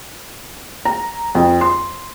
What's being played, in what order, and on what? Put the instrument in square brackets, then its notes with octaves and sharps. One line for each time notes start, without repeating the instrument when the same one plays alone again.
[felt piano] A#5
F2
C6